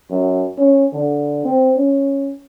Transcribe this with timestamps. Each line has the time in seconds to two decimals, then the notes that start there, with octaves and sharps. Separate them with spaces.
0.10 F#2
0.58 C#4
0.93 D3
1.45 C4
1.76 C#4